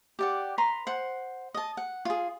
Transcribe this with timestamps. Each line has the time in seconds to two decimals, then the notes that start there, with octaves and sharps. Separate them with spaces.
0.19 G4 D5 F#5
0.58 B4 A#5 C6
0.87 C5 F#5
1.54 D#5 A5
1.77 F#5
2.05 F4 G#4